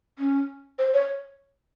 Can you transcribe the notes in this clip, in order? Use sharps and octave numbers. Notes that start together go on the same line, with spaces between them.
C#4
C5
C#5